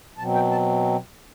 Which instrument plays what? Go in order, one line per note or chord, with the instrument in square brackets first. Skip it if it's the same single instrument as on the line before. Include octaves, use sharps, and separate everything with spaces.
[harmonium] B2 F#3 C4 A5
G5
A5